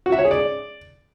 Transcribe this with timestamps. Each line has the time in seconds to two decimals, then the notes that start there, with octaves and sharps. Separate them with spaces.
0.06 F#4
0.12 E5
0.18 C#5
0.25 G#4
0.31 D5